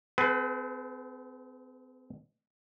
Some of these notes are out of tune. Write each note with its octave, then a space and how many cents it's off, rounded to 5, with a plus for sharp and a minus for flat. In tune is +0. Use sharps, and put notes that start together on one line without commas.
C4 -35 G#4 +45 B4 +15